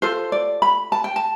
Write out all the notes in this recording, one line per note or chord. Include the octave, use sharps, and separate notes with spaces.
F4 A4 C5
D5
B5
A5
G5
A5